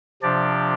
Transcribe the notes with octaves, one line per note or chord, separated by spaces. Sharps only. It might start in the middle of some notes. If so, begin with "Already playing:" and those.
C3 F3 D4 G4 D5